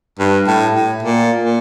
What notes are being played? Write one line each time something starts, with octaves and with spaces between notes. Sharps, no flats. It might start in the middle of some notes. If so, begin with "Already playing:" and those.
G2
A2
A2
A#2
A#2